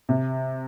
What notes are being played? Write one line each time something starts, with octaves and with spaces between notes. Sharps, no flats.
C3